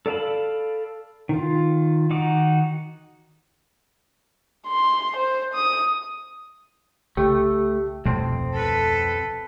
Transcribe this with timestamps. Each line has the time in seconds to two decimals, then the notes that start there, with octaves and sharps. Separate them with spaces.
0.06 A4 D5 F5 A5 B5
1.29 D#3 F4
2.10 D#3 D#4 F#4 D6
4.67 C6
5.17 C5
5.55 D#6
7.17 C2 C#3 A3 G4
8.05 D1 C2 F2 B2 A3 C4
8.54 A4 B4